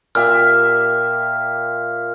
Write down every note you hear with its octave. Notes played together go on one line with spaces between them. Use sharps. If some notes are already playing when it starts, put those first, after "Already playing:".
A#2 G4 E5 F6